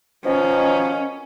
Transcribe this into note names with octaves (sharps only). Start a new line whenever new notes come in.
B2 D#3 F3 C#4